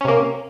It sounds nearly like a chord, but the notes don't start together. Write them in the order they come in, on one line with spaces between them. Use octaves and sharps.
C#4 C3 A#3